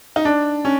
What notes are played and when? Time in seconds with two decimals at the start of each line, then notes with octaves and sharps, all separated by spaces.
0.16 D#4
0.25 D4
0.65 C#4